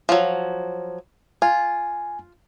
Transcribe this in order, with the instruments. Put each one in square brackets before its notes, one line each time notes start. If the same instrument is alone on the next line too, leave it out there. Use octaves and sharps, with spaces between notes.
[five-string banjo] F3 F#3
[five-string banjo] F4 [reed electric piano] G#5